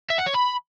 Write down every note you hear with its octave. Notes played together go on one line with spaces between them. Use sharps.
E5
F#5
C#5
B5